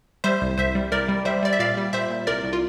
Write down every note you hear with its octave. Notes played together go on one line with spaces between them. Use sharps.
G3 C5 E5
C2
C2 C5 E5
G3
C2 A#4 D5
G3
G3 C5 E5
G3 D5
E5
A#2 D5 F5
G3
A#2 C5 E5
A#2
C2 A#4 D5
C2
F4